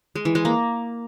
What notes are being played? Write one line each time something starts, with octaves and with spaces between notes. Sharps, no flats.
G#3
E3
G#3
A#3